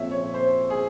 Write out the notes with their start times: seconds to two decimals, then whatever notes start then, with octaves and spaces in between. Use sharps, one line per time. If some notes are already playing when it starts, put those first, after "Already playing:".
Already playing: A#2 F3 C4 C#5 E5
0.11 C#5
0.34 C5
0.70 G#4